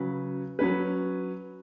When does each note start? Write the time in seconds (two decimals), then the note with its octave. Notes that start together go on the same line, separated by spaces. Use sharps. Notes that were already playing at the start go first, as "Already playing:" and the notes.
Already playing: C#3 F#3 C#4 F#4 B4
0.59 F#3 C#4 B4